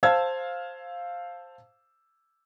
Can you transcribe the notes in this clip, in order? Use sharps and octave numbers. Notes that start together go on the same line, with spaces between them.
C5 F5 A5 E6 G#6